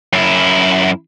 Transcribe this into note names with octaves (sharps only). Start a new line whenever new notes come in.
F#2 E4